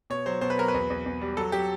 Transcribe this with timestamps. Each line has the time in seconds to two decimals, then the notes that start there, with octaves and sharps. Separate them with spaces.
0.10 B2 C#5
0.26 F#3 C5
0.41 B2 C5
0.50 B4
0.57 F#3 A#4
0.68 B4
0.74 E2
0.90 E2
1.05 E2
1.21 G3
1.37 F#3 A4
1.52 F#3 G4